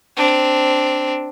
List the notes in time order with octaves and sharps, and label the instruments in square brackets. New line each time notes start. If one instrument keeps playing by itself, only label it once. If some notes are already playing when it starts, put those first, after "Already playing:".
[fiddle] C4 D4